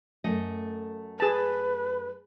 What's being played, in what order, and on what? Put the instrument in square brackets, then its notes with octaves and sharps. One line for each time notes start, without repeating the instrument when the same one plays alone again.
[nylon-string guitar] F#2 A3 D#5
[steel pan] G#4 A5 [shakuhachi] B4